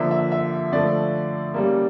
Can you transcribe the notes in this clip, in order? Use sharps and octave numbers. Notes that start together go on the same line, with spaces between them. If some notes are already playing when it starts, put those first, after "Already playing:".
Already playing: D3 F3 A#3 E5
E5
E5
D3 F3 A3 D5
C#3 G3 A#3